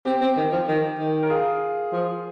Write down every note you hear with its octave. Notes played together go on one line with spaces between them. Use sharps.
C4 G4
C4
D#3
F3
D#3
D#3
A#4
F4 G#4
F3